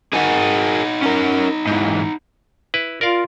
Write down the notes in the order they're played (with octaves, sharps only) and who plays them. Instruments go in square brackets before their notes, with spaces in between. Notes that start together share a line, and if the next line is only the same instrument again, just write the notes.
[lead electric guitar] D#4 F#4 [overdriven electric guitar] G#4 A#4
[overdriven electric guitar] C#4 A#4
G#2 E3
[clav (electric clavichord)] E4 B4
[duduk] F4 [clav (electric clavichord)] A#4 D5 F5